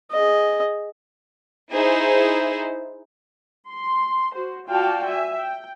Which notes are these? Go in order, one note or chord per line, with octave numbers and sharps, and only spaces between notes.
G#4 D#5
D#4 E4 G#4 C5
C6
F#4 C5
F4 F#4 D5 F5 G5 A5
E5 G#5
G5